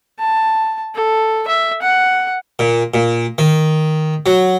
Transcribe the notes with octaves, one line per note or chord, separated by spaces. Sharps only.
A5
A4
E5
F#5
A#2
A#2
D#3
F#3